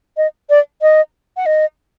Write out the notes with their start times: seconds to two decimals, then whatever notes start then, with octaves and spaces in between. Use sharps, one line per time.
0.17 D#5
0.50 D5
0.82 D#5
1.37 F#5
1.46 D#5